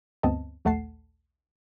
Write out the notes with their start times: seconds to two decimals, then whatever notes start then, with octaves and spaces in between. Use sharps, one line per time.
0.23 D2 G2 B3 C4 D#5 A5
0.65 A#1 D#2 A3 F#5 A5 C7